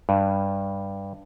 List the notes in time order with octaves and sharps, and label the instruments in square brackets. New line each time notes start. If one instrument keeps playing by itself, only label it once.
[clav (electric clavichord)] G2